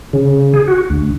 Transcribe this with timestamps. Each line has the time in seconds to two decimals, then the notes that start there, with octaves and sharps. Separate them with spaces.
0.13 C#3
0.54 G#4
0.68 F#4
0.90 D2